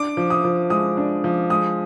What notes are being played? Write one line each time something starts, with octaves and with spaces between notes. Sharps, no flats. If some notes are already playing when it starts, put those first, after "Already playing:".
Already playing: D4 D6
F3
D#6
F3
G#3 D#6
D4
F3
G#3 D#6